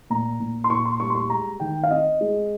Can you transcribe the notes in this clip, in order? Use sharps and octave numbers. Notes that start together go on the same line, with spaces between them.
A#2 A#5
A#2
C6
A#2 C#6
C6
G3 C#6
C6
C#6
G#3 A#5
D#3 G5
F5
C4 D#5
G#3